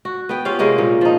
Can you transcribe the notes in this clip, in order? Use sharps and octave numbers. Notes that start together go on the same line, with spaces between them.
F#4
B3 G5
C#4 F4 G4 F5
C3 G#3 A#3 C#4
A#2
F3 D#4